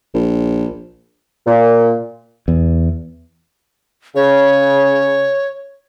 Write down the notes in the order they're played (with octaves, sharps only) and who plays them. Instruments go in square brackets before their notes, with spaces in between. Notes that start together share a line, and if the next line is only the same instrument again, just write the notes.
[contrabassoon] A#1
[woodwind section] A#2
[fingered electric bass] E2
[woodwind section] C#3 [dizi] C#5